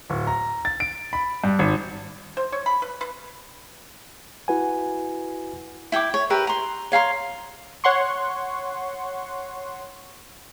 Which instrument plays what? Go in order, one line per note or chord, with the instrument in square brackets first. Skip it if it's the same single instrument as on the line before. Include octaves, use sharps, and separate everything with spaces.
[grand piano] D1
A#5
A6
D7
B5
G2
G#1
[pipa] C5
C#5
B5
B4
B4
[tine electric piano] E4 F#4 B4 F#5 G#5
[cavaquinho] E4 G5 G#5 D6
C#5
G4 A#4 B4 E5
A#5 C6
C#5 F5 A#5 C6
[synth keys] C#5 F#5 C6 C#6